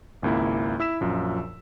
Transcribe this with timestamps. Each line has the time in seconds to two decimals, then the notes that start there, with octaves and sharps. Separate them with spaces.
0.22 G#1 C#2 A#3 E4
0.80 E4 E6 B6 E7
1.00 A#1 F#2 F3